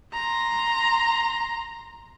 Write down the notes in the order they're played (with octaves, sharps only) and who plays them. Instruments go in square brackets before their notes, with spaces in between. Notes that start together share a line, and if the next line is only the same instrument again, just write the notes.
[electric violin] A#5 C6